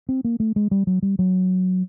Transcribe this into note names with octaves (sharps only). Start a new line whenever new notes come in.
C4
A#3
A3
G#3
G3
F#3
G3
F#3